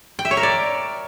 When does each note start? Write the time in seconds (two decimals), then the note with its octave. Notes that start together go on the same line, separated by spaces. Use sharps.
0.19 G5
0.25 E5
0.31 C#5
0.37 A#4
0.43 D5